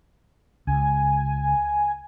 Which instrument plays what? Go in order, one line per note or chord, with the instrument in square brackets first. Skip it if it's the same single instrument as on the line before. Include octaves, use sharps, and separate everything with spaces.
[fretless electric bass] C#2 [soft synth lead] G#5